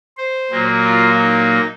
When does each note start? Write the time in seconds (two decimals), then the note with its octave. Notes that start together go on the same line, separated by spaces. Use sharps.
0.17 C5
0.51 A#2 F#3 A#3
0.84 F4
1.19 D#4